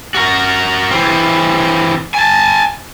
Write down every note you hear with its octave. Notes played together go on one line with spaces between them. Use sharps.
F#4 A#4
E3 C4
G#5 A5